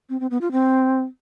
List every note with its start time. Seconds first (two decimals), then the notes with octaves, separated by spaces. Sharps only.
0.09 C4
0.20 C4
0.31 B3
0.41 F4
0.52 C4